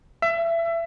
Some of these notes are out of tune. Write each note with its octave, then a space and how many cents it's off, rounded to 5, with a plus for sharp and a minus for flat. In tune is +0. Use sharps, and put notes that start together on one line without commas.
E5 +25